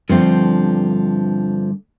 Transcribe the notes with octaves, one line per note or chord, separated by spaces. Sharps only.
G2 D3 F3 A3 C4